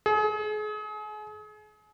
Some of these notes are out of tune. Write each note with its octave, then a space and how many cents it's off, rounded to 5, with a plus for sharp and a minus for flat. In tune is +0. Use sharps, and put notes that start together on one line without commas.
G#4 +35